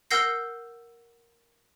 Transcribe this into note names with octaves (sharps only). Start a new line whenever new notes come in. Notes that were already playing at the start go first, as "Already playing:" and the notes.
A#4 F#5 E6 G6 A#6 C7